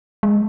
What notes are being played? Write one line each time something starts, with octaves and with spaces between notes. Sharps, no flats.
G#3